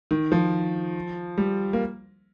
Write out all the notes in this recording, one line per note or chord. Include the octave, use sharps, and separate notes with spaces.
D#3
F3
G3
A#3